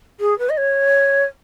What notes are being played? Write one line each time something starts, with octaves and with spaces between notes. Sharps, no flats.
G#4
B4
D#5
C#5